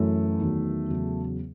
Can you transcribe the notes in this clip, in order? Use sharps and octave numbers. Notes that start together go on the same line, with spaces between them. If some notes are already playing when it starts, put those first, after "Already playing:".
Already playing: F#2 E3 A3
E2 D#3 F#3
E2 C#3 F#3